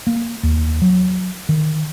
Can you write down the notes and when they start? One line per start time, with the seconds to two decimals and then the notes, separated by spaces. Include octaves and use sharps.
0.07 A#3
0.43 D#2
0.82 F#3
1.49 D#3